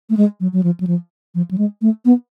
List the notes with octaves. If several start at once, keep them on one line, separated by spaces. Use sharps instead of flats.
A3
G#3
F#3
F#3
F3
F#3
F3
F3
F#3
G#3
A3
B3